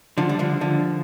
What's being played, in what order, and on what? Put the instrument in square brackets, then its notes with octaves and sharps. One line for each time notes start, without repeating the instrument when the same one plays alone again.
[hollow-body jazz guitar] D3 F3
G3
D3 F3
D3 F3